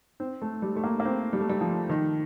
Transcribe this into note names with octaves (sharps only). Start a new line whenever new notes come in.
C4
A3
G3
A3
A#3
A#3
C4
G3
A3
G3
F3
D#3